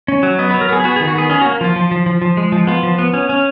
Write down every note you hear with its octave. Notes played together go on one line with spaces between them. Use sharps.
C#4
F#3
B3 D#5
B4
F#3
A#4
B3 G#4
G#4
B3 F#4
G#4
D#3
F#4
B3 G#4
C#4 G#4
F#4
A#3
F3 F4
F3
F3
F3
F3
G#3
F3
B3 F4
F3
B3
C#4
C#4